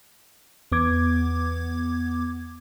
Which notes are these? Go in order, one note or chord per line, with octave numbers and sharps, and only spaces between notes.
E2 B3 D6 G#6